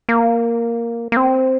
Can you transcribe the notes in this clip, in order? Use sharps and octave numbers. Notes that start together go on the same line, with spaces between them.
A#3
A#3
C4